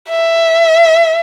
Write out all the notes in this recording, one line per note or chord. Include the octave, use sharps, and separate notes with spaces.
E5